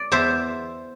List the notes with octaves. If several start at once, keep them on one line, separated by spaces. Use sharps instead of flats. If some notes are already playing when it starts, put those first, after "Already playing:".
Already playing: D5
E2 C5 E5